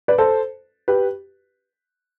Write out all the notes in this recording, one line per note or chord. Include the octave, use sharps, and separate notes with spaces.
B4 D5
A4 C5
G4 B4